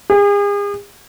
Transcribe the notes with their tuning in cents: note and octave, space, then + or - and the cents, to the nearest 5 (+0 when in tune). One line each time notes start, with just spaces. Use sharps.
G#4 -40